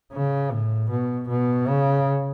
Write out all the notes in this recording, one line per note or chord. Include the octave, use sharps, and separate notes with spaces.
C#3
A2
B2
B2
C#3